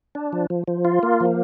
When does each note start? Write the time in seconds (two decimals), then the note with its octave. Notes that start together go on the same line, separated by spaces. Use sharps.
0.15 D4
0.33 F3
0.50 F3
0.68 F3
0.85 F4
1.03 A#3
1.20 F3